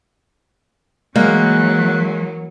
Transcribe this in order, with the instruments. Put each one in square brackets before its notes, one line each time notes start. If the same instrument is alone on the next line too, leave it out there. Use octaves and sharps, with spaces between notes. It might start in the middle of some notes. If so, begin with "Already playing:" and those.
[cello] E3 F#3 [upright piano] G#3 [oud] A#3 [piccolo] F#6